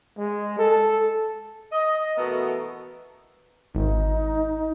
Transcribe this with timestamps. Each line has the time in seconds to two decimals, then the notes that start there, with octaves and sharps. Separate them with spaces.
0.18 G#3
0.59 A4
1.72 D#5
2.17 B2 E3 A3 B3 A4 A#4
3.75 G#1 D#4